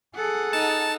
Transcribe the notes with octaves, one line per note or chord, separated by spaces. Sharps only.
G#4 A4 F#5
D#4 A5